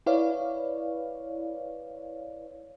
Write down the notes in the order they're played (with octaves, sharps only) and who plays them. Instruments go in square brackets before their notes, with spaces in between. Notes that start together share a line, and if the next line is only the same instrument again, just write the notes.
[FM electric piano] E4 B4 C#5 D5 F5